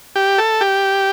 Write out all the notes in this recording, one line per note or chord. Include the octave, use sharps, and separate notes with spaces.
G4
A4
G4